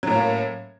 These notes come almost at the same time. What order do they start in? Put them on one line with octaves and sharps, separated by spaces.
F#3 A2 C#4 A#3